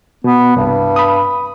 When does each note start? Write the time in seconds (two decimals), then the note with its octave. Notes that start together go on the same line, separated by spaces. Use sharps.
0.24 B2 B3
0.56 C2 G2
0.96 B5 D#6